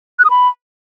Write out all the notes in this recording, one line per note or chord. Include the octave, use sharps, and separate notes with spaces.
F#6
D#6
B5